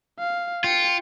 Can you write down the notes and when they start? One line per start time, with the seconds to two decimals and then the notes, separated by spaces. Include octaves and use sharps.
0.19 F5
0.64 F4 G5 C#7